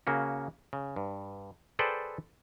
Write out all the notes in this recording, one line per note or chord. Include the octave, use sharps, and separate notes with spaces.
C#3 A#3 C#4 F#4
C#3
G2
G#4 A4 B4 C5 D5 G5